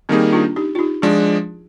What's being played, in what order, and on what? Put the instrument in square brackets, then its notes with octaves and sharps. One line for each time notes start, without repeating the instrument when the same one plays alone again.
[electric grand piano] D#3 G3 A#3 D#4 G#4 [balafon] C4
[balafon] D4 F4
D#4 G4
F4
D#4 G4
[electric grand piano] F3 G#3 D4 [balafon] F4 G#4